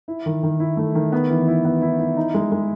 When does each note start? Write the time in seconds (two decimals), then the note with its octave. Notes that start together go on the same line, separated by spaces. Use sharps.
0.08 E4
0.26 D#3
0.43 D#3
0.60 E4
0.77 A3
0.95 D#3
1.12 B3
1.30 E3
1.47 E4
1.65 B3
1.82 E4
2.00 E4
2.17 D#4
2.34 G#3
2.52 G#3